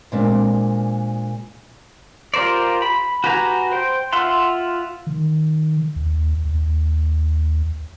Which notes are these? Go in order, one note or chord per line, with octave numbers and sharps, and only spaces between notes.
A#2 G#3 C4 D4
F4 G4 A#4 C5 D5
B5
F#4 G4 B4 G#5 A#5
C5 G5
F4 E5 F#5 C6
D#3
D#2
D#2